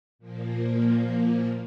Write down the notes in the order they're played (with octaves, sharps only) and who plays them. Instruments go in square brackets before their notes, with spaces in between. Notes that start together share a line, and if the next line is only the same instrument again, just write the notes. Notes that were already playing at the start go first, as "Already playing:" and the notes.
[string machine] A#2 F3 A#3